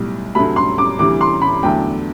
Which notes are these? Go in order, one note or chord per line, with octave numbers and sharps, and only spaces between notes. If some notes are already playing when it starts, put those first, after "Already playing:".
Already playing: B1 A2 G3
D2 C3 F#3 A3 B5
C6
D6
D2 C3 E3 G3 D6
C6
B5
E2 D3 F#3 A3 G5